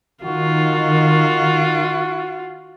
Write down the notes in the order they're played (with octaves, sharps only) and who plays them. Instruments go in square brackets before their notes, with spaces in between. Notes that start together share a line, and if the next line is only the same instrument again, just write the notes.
[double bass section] D#3 [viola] F4 [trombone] F#4